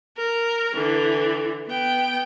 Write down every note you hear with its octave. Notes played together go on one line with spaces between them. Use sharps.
A#4
D3 E3
B3 G5